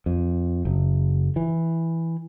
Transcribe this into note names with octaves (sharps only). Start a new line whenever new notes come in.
F2
F#1
E3